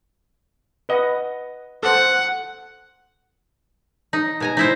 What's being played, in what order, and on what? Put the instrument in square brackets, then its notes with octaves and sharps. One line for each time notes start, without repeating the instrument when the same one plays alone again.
[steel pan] B4 D#5 F#5
[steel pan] A4 C5 [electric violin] F#5
[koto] D#4
B2 G#5 A#5
D#4 E4 C5